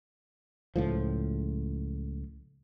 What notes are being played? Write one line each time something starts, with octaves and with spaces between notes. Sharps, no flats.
C#2 A2 F3